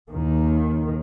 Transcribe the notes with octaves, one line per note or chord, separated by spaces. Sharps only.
D#2 D#3